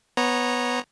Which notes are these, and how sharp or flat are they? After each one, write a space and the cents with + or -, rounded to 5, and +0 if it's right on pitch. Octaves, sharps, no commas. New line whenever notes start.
B3 +0 C#5 -15 A#5 +0